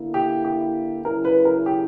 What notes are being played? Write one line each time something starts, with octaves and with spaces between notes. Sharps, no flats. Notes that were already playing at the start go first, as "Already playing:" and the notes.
Already playing: D3 A#3 E4
G4
G4
C#3 F#3 C#4 E4 A#4
B4
A#4
G4